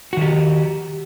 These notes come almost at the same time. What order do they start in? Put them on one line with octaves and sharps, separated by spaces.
F#4 D#3 G4